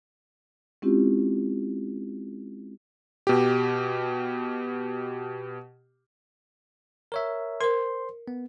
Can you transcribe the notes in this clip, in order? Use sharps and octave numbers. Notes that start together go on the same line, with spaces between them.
G#3 C4 C#4 E4 F4 G4
B2 G4
A#4 C#5 E5
A#4 C5 C6
B3